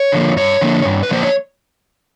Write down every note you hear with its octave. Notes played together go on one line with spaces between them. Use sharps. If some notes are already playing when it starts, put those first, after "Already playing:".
Already playing: C#5
D3 F3 A#3
G2 C#5
D3 F3 A#3
G2
B4
D3 F3 A#3 C5
C#5